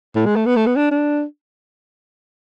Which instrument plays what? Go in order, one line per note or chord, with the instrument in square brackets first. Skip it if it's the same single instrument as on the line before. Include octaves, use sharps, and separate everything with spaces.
[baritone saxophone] A2
G#3
A3
B3
A3
B3
D4
D4